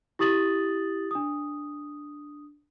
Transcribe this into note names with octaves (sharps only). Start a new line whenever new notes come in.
E4 G4 D#6 A6 F#7
D4 D#6